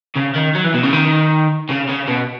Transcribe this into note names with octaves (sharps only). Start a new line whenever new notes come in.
C#3
D#3
F#3
E3
B2
C#3
D#3
C#3
C#3
B2